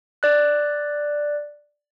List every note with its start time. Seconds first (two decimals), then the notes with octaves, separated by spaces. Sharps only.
0.23 D5 F#6